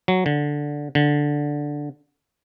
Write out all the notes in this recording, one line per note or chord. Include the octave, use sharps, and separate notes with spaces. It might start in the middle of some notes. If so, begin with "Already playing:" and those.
F#3
D3
D3